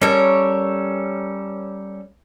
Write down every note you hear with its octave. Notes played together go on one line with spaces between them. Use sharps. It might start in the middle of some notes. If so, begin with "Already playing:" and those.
G3 C#4 A4 A#4 C#5